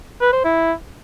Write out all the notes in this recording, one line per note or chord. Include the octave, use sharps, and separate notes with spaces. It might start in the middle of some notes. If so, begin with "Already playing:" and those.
B4
C5
E4